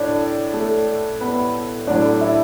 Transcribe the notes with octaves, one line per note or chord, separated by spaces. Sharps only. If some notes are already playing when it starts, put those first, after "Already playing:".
Already playing: A2 D4 D5
A3 A4
B3 B4
A2 F#3 A3 D4 D5
E4 E5